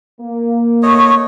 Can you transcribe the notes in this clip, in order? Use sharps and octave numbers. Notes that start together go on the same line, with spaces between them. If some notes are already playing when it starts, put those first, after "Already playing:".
A#3
A3 C#5 D#5